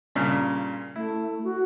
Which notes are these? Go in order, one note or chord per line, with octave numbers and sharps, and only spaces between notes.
G2 A#2 C#3
A3 E4
F#4